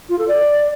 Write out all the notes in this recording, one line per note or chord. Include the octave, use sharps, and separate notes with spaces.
F4
A4
D5